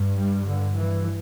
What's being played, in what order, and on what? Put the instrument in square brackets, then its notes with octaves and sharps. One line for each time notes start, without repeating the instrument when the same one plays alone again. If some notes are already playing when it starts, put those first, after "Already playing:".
Already playing: [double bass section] G2
G3
D3
E3